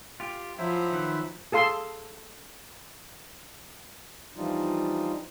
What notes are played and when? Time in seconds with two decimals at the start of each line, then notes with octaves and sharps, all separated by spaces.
0.20 F4 G4
0.58 F3 F#3 E4 C5 E5
0.92 D#3 B4
1.52 G#4 A4 F5 C6 E6
4.36 E3 F3 G3 D4 D#4 F4